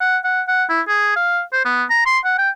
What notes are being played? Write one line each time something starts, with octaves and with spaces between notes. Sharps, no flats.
F#5
F#5
F#5
E4
G#4
F5
C5
B3
A#5
C6
F#5
G5